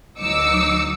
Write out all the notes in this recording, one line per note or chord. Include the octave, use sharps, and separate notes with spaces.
D2 F#3 D#4 D6 E6 C#7